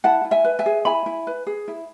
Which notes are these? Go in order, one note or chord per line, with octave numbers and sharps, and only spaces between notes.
E4 F#5 A5
E4
E5 G#5
B4
E5 G#5
G#4
E4 G#5 B5
E4
B4
G#4
E4